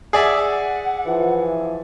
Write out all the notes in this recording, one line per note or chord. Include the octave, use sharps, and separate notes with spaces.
G#4 D5 E5 F#5
E3 F3